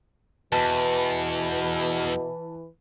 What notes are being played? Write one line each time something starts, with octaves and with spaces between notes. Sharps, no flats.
E2 B2 E3 B4 A5